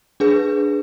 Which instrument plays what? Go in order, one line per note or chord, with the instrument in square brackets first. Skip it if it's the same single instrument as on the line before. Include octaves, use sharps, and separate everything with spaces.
[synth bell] D4 G#4 B4